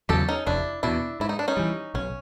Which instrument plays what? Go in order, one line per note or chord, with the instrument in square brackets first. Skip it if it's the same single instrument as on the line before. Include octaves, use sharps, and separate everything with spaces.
[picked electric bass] E2 C#3 F#3 [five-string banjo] G4 A4
[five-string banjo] C#4 D#4
[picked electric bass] F1 [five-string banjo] D4 E4
[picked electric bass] E2 B2 [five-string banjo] D4 E4
[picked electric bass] G#2 [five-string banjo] E4
[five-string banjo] D#4
D4
C#4 D#4
[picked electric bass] E3 G3
[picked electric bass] B1 [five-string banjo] C#4